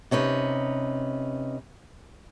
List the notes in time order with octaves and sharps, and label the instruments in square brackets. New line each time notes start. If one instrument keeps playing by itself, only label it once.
[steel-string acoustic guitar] C3 C#4 D#4 B4